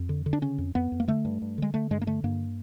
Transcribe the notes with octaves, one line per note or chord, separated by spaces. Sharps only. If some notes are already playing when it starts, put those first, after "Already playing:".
Already playing: F2
D3
D3
D4
C#3 C#4
F2
F2 B3
F2
A#3
D3 A3
G2
G2
D3 G#3
D3 A3
G2 G#3
A#3
D3 A3
G2 A#3